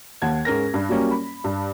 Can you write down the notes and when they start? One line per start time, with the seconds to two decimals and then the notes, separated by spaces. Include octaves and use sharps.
0.22 D#2 F#5 A5 G#6
0.45 G#2 C#4 A#4 A#6
0.74 G2
0.89 F#3 G3 A#3 C#4
1.11 B5
1.44 G2